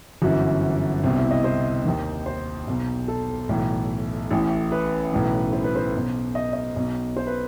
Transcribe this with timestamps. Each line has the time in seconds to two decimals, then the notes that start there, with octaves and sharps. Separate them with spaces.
0.22 G1 F#2 E3 F#4
1.03 C2 B2 C4
1.17 E4
1.31 D#5
1.44 C5
1.85 D#2 D#3
2.26 C5
2.67 B1 B2
3.08 A4
3.49 B1 A2 E3
4.31 A1 A2 E3
4.72 B4
5.12 B1 A2 E3
5.53 C5
5.64 B4
5.76 C5
5.94 B1 B2
6.35 D#5
6.53 D#5
6.76 B1 B2
7.17 C5
7.27 B4